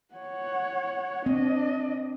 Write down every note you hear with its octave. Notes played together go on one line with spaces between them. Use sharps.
C#5 F#5
C4 D4 D#5